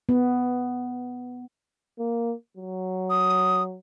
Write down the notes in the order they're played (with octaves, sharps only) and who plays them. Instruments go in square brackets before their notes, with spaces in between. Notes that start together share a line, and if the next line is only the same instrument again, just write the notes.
[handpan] B3
[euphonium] A#3
F#3
[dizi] D#6